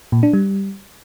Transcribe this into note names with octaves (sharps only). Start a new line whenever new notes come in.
A#2
D4
G3